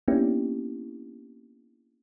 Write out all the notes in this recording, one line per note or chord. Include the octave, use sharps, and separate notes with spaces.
A#3 B3 C#4 D4 E4 G4